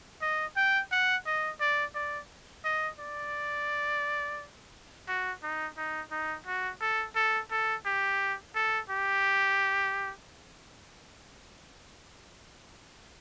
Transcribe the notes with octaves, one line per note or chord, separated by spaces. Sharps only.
D#5
G5
F#5
D#5
D5
D5
D#5
D5
F#4
D#4
D#4
D#4
F#4
A4
A4
A4
G4
A4
G4